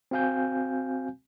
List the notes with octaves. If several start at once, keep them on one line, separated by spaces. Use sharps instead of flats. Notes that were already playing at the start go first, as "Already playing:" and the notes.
C4 F#4 F5 G#5 G6